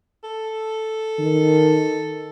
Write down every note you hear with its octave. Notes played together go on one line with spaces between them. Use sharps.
A4
D#3